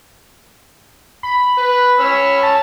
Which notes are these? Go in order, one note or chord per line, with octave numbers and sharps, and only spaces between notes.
B5
B4
C#4 C#5 E6
A5